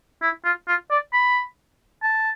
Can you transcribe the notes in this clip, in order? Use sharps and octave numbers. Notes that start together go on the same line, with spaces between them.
E4
F4
F4
D5
B5
A5